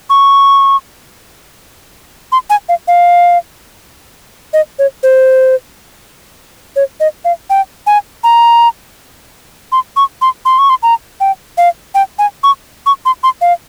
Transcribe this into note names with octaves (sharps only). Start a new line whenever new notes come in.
C#6
C6
G#5
F5
F5
D#5
C#5
C5
C#5
D#5
F5
G5
G#5
A#5
C6
C#6
C6
C6
C#6
C6
A#5
G5
F5
G5
G#5
C#6
C#6
C6
C6
F5